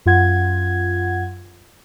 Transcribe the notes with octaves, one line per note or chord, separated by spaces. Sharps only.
F#2 F4 F#5 G#6